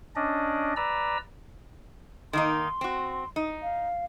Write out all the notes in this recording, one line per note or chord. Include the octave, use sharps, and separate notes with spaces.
C#4 D4 D5 D#5
B4 D5 A#5 E6
D#3 A#3 D#4 C6
C4 F#4
D#4
F5